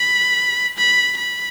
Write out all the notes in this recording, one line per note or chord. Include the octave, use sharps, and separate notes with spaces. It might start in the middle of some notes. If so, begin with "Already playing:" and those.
Already playing: B5
B5
B5